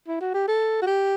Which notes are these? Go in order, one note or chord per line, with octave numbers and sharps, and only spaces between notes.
E4
F#4
G4
A4
F#4
G4